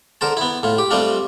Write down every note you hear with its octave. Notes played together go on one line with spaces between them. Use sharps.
D3 A#4 C5 A5
B3 E4
A2 F4
G4
G3 A3 C4 D4 F4